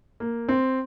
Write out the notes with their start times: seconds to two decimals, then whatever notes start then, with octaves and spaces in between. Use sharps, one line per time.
0.20 A#3
0.49 C4